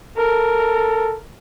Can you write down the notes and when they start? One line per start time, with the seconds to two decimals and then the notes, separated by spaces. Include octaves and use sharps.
0.17 A4 A#4